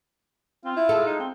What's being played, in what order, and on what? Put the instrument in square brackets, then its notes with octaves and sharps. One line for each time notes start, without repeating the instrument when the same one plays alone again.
[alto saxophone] C4 [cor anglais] F4
[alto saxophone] E4
[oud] G#3 A4
[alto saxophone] D#4
C4